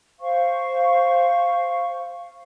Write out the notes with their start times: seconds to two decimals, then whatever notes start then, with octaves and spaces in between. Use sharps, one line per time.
0.20 C5 F5 C#6